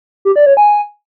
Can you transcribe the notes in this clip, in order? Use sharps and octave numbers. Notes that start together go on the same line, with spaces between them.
G4
D5
C#5
G#5